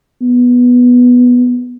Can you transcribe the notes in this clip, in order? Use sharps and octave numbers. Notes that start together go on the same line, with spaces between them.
B3